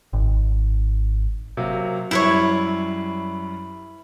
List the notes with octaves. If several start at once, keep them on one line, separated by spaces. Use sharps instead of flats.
G#1
C3 F#3 A#3
F#2 G3 E4 B4 C#5